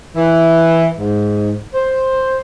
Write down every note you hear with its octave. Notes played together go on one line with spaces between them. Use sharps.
E3
G#2
C5